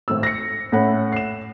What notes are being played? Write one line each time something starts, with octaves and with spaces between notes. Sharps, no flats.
G#1 A2 E6
A#6 C#7
A2 C#4 F#5 B5
C7 E7